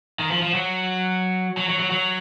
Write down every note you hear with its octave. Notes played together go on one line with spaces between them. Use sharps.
D#3
F3
F3
F#3
F#3
F#3
F#3
F#3